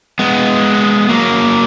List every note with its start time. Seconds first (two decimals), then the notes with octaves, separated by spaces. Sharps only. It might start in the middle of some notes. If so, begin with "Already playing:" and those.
0.19 G#3 B3
1.09 F#3 A#3